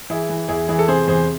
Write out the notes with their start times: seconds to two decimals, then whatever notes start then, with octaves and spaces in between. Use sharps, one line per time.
0.10 E3 E4 G#4
0.29 E3
0.49 E2 E4 G#4
0.68 E3 E4 G#4
0.79 A4
0.88 C3 G#4 C5
1.07 E2 G#4 C5